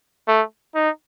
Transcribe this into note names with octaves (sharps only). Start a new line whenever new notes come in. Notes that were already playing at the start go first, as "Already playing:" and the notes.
A3
D#4